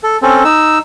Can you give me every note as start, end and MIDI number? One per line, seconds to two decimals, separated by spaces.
0.03 0.17 69
0.22 0.43 60
0.22 0.43 61
0.22 0.43 69
0.45 0.79 63
0.45 0.79 88